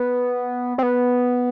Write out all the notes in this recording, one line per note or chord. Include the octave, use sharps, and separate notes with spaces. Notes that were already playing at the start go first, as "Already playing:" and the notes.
Already playing: B3
C4
B3